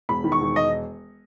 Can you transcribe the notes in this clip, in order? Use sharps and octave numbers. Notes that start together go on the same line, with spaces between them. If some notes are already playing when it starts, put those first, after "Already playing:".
E1 B5
D#3
C#6
E1
D#5